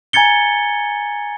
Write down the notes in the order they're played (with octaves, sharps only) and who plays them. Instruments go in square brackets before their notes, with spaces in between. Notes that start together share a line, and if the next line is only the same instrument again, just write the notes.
[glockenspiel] G#5 A#5 G#6 A6 C#7 G7